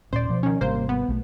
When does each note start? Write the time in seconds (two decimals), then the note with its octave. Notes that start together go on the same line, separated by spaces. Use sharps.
0.13 D#1 A#2 C#4 C5 D5
0.29 B2 F3
0.43 D#3 C#4
0.61 G#1 C3 G3 A#3 C5
0.89 B3
1.08 B1 A3